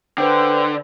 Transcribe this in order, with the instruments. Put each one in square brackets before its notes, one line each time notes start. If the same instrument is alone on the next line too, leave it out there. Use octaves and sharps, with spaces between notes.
[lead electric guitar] D3 [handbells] B4 C5 G5